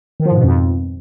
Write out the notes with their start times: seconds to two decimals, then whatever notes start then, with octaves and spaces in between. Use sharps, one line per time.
0.20 D#3
0.25 F3
0.31 G#2
0.37 B2
0.43 F2